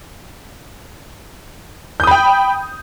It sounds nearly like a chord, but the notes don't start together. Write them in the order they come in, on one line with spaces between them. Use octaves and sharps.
G6 D#6 B5 G5